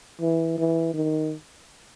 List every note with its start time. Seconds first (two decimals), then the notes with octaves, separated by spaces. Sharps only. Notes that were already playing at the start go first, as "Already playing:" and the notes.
0.21 E3
0.58 E3
0.94 D#3